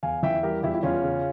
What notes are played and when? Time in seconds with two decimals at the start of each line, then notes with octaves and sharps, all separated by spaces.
0.03 E2 F5 G#5
0.23 E3 E5 G5
0.43 G3 G4 A#4
0.63 E2 E4 G4
0.74 E4
0.83 E2 C#4 F4
1.03 C#3